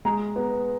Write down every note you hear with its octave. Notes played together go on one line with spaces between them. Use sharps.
G#3 A#5
B3